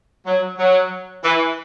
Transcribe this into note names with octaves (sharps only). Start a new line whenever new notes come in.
F#3
F#3
E3